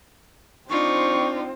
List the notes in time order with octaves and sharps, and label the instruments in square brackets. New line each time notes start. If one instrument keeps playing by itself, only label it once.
[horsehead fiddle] C4 C5 [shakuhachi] D4 [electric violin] D#4 F4 [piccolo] C#6